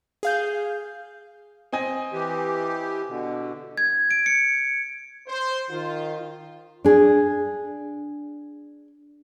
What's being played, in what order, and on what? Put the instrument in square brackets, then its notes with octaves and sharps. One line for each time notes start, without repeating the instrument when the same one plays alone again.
[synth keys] G#4 F5 G6
[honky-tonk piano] C4 D#5 G#5
[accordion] E3 G4
B2 D3
[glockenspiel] G#6
D7
C#7
[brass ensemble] C5
D#3 F4
[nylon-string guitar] D4 G#4